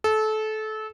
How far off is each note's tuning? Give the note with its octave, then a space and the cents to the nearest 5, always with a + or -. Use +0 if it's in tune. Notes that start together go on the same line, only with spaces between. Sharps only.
A4 -25